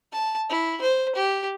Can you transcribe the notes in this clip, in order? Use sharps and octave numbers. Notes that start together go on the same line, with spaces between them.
A5
E4
C5
G4